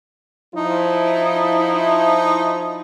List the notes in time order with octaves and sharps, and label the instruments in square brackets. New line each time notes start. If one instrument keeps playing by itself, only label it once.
[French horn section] F3 E4 [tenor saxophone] D#4